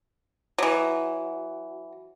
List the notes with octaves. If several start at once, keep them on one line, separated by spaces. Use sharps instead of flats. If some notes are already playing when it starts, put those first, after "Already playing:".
E3 F#3